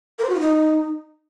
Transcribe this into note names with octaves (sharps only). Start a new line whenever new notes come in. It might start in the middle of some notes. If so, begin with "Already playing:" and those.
A#4
C5
F#4
F4
D#4